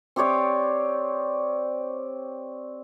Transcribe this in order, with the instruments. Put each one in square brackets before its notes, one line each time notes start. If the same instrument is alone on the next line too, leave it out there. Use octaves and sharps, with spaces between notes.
[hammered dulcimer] C4 G4 C#5 D5